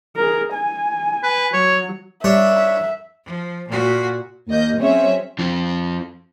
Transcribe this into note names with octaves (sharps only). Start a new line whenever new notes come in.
G#4 A#4
G#5
B4
F#3 C#5
G3 D4 C#5 E5
F3
A#2 F#4
D#2 A#3 D#5 G6
F#3 C4 C#4 G#4 C#5 E5
F2 F3